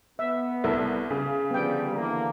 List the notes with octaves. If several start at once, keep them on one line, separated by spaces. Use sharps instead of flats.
B3 E5
C2 A4 A#4 E5
C#3
D3 F3 G3 B3 G5
D3 E3 A#3